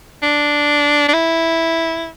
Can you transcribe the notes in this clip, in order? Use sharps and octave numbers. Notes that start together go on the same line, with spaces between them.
D4
D4
E4